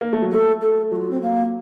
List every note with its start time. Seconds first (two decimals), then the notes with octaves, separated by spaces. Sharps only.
0.01 A#3
0.13 A3
0.22 F#3
0.31 A3 A4
0.61 A4
0.90 F#3 F4 F#4
1.10 C4
1.21 A#3